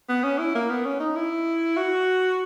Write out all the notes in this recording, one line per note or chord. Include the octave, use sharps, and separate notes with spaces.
B3
C#4
E4
A#3
B3
C#4
D#4
E4
F#4